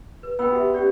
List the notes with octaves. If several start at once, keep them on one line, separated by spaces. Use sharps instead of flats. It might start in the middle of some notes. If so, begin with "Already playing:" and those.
B4
B3 G5 E6
F#4 G4 E5
C#4 G4 D5